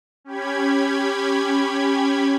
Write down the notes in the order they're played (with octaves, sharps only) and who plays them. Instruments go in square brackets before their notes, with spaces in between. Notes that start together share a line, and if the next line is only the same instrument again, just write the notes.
[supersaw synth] C#4 G4 B5 G#6